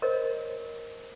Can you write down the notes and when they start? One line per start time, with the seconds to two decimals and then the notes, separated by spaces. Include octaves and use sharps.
0.02 A#4 C5 C#5 D#5